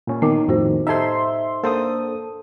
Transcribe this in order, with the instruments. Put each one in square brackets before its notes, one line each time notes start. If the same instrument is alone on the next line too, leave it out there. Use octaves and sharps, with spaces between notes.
[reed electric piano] A#2 C#4
[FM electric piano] D#3 [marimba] B3 D6
[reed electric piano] F2 A2 [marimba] F4 F#4 C5
[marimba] A2 E6 G#6 [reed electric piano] D#4 A4 C5 [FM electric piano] E5 C6
[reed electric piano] A#3 D4 C5 [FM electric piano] A4 D#6